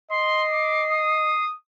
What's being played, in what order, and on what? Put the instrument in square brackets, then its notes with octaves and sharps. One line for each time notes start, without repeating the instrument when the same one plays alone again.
[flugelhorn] D#5 [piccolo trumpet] C6 [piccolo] C7
[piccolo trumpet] D6
D#6